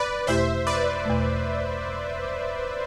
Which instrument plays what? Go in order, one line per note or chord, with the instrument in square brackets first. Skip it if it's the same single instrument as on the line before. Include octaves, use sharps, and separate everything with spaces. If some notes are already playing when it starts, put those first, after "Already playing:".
Already playing: [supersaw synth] B4 D5
[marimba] E2 B2 A3 E4 G4 [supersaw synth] C5 E5
[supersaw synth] B4 D5
[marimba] E2 B2 A3